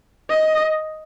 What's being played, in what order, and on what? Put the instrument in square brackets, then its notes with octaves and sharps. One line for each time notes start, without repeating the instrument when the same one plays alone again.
[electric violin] D#5